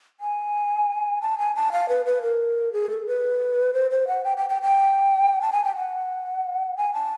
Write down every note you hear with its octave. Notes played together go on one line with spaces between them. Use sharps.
G#5
A5
G#5
A5
F5
B4
B4
A#4
G#4
A4
B4
C5
C5
F#5
G5
G5
G5
G5
A5
G#5
G5
F#5
G#5
A5